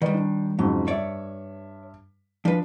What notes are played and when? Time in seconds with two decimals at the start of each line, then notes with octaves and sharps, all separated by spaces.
0.02 D#3 G3 B4 D5 D#5
0.14 D4
0.59 F2 G#2 C#3 F#3
0.88 G2 C#5 D5 E5
2.45 F3 D4 B4